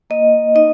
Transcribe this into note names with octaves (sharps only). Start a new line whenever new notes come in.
A#3 D#5
D#4 D#5